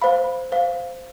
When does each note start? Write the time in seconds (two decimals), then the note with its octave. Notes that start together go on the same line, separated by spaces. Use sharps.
0.02 C5 F5 B5
0.52 C5 F5